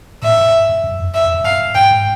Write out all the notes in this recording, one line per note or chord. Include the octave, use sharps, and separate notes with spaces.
A2 E5
G2
G2
F#2
F2
E5
F2
F#2
G2 F5
G2
G#2 G5
G#2